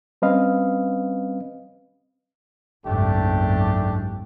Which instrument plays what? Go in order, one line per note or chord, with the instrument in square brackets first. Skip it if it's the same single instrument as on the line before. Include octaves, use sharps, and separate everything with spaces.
[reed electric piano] G3 C4 C#4 B4 D#5 F5
[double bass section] F#1 B1 G#2 [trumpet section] A3 D4 G4